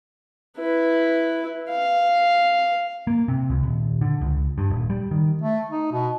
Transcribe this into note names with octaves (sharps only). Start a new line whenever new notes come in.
E4 B4
F5
A#3
C3
C#2
D#1
D3
C#2
G2
D#1
G3
D#3
A3
D#4
B2